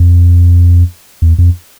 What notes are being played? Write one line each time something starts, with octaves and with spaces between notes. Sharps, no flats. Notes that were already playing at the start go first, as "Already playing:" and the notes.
Already playing: F2
E2
F2